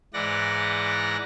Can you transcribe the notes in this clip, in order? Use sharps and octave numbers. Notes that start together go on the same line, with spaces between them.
G#2 E3 D5 F#5 A#6